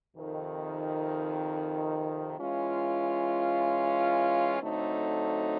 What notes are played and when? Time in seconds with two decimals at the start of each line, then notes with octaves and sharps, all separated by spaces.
0.14 F2 C3 D#3
2.38 E3 G#3 C#4 F4
4.61 D3 F#3 A3 C4 D#4